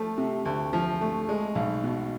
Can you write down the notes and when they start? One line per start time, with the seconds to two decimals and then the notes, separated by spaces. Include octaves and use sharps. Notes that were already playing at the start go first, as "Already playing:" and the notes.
Already playing: F3 A3
0.18 C3
0.45 D2
0.73 F3
1.01 A3
1.29 G#3
1.55 B1
1.83 B2